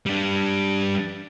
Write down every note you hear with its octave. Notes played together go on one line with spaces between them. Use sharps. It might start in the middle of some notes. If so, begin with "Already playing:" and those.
G3 D4